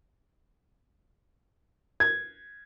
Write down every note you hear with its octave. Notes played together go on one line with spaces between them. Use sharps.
G#6